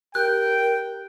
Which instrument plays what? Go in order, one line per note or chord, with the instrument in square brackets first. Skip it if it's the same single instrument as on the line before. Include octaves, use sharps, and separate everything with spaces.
[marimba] G4 [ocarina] A#4 [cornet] G5 [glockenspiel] F#6